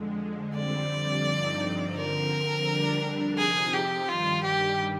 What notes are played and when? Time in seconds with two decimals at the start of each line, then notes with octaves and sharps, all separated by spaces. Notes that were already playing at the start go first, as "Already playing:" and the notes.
Already playing: F2 D3 G#3
0.55 F2 D3 G3 C4 D5
1.25 G2 D3 F3 C4 D#4
1.96 D3 F3 C4 A#4
2.67 F2 D3 G3 D4
3.37 F2 C3 F3 C4 D#4 G#4
3.73 G4
4.08 G2 D#3 G3 F4
4.44 G4